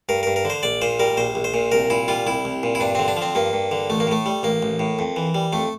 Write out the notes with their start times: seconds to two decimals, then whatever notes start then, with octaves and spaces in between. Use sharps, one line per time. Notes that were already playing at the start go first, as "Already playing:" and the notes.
0.09 G2 A#4
0.23 A#4
0.27 G2
0.36 A#4
0.45 D3 C5
0.63 A#1 D5
0.82 A#2 C5
0.99 G3 A#4
1.17 A#1 C5
1.35 A#1
1.44 C5
1.54 A#2
1.72 C2 A#4
1.90 A#2 E4
2.08 G3 F4
2.26 C2 E4
2.45 C2
2.63 A#2
2.75 E4
2.80 G2 D4
2.95 D3 C4
3.08 D4
3.16 F3
3.22 C4
3.35 G2 A#3
3.53 G2
3.71 D3
3.90 A1 A3
4.00 A#3
4.07 A2 A3
4.26 G3
4.43 A1 A#3
4.63 A1
4.80 A2
4.99 F2
5.16 E3
5.35 G3
5.53 F2 A3